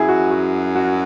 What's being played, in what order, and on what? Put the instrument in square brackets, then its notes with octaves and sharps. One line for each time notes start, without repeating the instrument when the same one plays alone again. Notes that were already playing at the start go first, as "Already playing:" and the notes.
Already playing: [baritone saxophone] F#2 [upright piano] E4 G#4
[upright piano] F#4
F#4
F#4